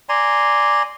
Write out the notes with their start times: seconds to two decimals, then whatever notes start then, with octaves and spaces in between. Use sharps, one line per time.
0.09 D5 G#5 A#5 C6